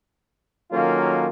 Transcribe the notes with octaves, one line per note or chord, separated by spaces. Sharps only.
D#3 F#3 A#3 C#4 F4 A4